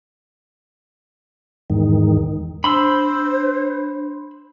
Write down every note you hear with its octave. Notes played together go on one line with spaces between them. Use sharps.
E2 G#2 D#3
D4 C5 B5 C6 E6